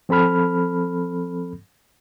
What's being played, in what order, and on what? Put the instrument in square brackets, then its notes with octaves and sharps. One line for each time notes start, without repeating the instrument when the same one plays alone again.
[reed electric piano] F3 C4 A4 B5 F6